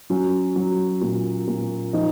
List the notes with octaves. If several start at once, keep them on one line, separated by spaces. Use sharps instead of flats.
F#3 C#4
F#3
A#2
A#2
F3 D#4